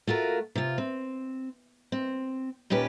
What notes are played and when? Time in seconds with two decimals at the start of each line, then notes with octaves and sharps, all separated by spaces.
0.07 A3 F4 F#4 A#4
0.55 C3 F4
0.78 C4
1.92 C4
2.70 D#2 A#2 C#4 G4 B4